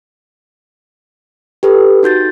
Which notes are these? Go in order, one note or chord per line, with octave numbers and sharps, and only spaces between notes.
G4 A4 B4
D#4 F#4 G6 A6